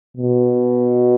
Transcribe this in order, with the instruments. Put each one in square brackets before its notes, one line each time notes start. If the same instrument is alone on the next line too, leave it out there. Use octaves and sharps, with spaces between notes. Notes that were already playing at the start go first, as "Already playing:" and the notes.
[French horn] B2